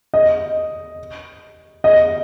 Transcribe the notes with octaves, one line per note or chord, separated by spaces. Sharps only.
D#5
D#5